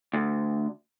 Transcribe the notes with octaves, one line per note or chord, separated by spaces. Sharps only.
D2